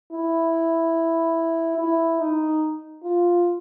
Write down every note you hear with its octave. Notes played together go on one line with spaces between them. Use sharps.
E4
E4
D#4
F4